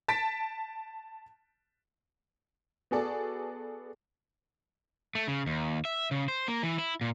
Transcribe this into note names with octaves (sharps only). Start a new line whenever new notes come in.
A5 A6 B6 D7
B3 F#4 G#4 A4 D5
A3
C#3
D#2
E5
C#3
C5
A#3
E3
E4
A#2